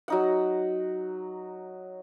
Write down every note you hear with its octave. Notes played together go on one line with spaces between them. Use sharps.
F#3 D#4 F#5